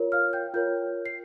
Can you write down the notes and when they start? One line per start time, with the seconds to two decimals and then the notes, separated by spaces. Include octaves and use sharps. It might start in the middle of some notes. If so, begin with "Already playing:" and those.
Already playing: F4 A#4 C#5
0.12 F5 F6
0.33 G5 G6
0.54 F4 A#4 C#5 G5 G6
1.06 C7